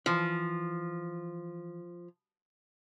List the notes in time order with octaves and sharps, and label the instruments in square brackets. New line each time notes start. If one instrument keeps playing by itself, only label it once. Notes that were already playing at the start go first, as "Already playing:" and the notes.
[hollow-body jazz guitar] E3 [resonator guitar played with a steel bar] F3